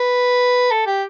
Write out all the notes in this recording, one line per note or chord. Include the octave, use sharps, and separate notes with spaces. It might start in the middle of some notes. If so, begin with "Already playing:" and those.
Already playing: B4
A4
G4